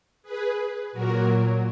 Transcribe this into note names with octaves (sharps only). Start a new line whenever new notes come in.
G#4 B4
A#2 F#3 F#4 A#4